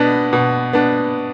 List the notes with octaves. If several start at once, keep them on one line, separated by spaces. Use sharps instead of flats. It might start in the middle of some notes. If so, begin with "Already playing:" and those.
Already playing: B2 B3 D4
B2
B3 D4